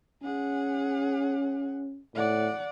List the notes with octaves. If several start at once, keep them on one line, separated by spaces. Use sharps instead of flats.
C#4 G#4 F#5
A2 D5 F#5